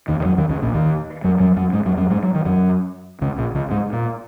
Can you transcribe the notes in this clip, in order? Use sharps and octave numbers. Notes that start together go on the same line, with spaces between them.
D#2 D#3
D#3
F#2 F#3
D#2 D#3
C#2 C#3
A#1 A#2
D#2 D#3
F#2 F#3
F#2 F#3
F#2 F#3
G#2 G#3
F#2 F#3
F#2 F#3
G#2 G#3
F#3
D#3
F#2 F#3
C#2 C#3
A#1 A#2
C#2 C#3
G#2 G#3
A#2